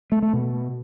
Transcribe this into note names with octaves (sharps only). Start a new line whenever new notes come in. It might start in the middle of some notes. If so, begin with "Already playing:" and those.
A3
A3
B2